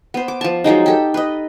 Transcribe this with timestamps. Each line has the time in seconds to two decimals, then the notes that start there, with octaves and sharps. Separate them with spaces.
0.14 B3 C5
0.28 D6
0.41 F3 A5
0.64 F3 F#3 G#3 D#4
0.86 G4 A4
1.14 B4 D#5